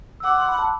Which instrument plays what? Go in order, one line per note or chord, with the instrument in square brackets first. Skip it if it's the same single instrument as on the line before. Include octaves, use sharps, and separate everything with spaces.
[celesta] E6
[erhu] F#5 [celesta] D6
[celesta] C6
B5
A5